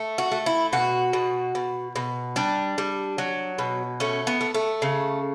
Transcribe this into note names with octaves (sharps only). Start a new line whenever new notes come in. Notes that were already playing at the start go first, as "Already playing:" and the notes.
Already playing: A3
F#4
A3
E4
B2 F#4
B2
B2
B2
G3 D4
G3
F#3
B2
A3 C#4
B3
A3
A3
C#3